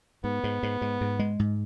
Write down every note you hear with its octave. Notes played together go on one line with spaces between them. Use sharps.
G#2 B3
G#2
G#2
G#2
G#2
G#3
G#2